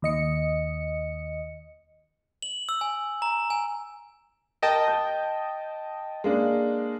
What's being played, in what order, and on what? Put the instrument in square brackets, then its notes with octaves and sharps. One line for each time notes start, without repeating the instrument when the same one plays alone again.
[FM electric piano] D#2 D#5 C#7
[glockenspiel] F#7
E6
G#5
A#5
G#5
[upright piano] A#4 [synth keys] D#5 G5 A5
[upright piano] G6
G#3 A#3 D4